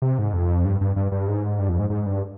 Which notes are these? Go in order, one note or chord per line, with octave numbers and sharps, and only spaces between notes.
C3
G#2
F2
G2
G2
G2
G2
G#2
G2
F2
G#2
G#2
G2